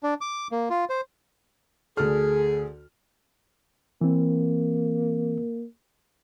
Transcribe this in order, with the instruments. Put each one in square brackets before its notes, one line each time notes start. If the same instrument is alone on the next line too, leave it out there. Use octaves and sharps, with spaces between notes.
[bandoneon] D4
D6
A#3
F4
C5
[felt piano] D2 A4 F6 [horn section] G#4
[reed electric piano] E3 C4 [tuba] A#3